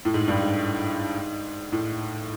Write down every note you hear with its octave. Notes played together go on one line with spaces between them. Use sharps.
A2
G#2
G2
G#2
A2